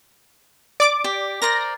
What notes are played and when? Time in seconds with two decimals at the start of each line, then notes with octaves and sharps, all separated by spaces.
0.80 D5 D6
1.04 G4
1.42 A#4 C5 D5 A#6